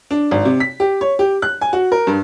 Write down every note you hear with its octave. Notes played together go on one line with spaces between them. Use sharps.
D4
G#1
C3
B6
G4
C#5
G4
F#6
G#5
F#4
A#4
G2